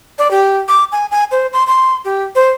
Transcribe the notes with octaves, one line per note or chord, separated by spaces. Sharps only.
D5
G4
D6
G#5
G#5
C5
C6
C6
G4
C5